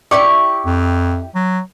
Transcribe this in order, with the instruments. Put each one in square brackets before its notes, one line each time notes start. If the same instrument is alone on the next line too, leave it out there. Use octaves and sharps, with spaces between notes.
[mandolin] E4 G4 C#6 [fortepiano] D5
[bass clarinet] F2
F#3